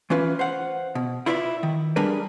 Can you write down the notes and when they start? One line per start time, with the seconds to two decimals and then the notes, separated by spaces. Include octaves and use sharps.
0.10 E3 C#4 F4 B4
0.39 C5 F5 F#5
0.95 B2
1.26 E4 F4 B4 C#5 D5 E5
1.63 D#3
1.96 G3 D4 G#4 A#4 B4